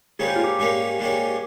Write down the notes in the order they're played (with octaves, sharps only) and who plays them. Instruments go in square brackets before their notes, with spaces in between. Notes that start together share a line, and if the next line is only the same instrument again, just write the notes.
[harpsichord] G#2 G3 A#3 C#4 [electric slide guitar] G#4
[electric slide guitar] G4
F4
G4
[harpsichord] G#2 G3 A#3 C#4
G#2 G3 A#3 C#4